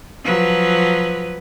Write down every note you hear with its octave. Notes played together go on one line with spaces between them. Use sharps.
F3 F#3 B4